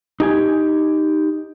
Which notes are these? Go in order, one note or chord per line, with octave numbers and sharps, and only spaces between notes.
D#4 G4 G#5